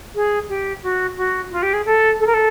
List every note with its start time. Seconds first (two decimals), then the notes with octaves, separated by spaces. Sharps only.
0.15 G#4
0.49 G4
0.83 F#4
1.17 F#4
1.51 F4
1.62 G4
1.73 G#4
1.86 A4
2.20 A4
2.26 A#4
2.34 A4